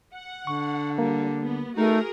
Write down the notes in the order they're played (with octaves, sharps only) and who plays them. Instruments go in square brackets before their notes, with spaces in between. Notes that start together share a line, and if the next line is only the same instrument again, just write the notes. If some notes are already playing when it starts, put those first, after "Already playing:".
[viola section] F#5
[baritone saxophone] D3 [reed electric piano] C#6
[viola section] G3 [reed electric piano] A#3
[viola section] B3
[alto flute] A3 [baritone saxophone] D#4 [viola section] F#4 G#4 A#4